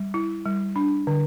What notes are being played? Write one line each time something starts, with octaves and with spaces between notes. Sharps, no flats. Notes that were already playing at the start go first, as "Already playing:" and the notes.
Already playing: G3
E4
G3
D4
D3